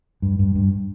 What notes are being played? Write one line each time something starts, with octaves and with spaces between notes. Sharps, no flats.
G2
G2
G2